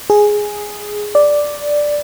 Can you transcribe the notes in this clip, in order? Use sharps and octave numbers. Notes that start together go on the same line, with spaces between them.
G#4
D5